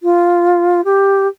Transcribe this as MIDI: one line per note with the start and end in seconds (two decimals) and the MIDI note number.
0.03 0.81 65
0.84 1.27 67